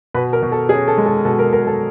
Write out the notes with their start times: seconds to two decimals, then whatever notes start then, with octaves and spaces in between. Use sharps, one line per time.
0.14 B2 B4
0.33 A#4
0.42 B2
0.52 A4
0.69 C#4 G#4
0.88 A4
0.98 G#3
1.06 A4
1.25 B2 A4
1.39 A#4
1.53 B2 A#4
1.67 A4